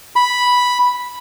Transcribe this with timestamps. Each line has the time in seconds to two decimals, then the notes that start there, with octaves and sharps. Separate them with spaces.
0.16 B5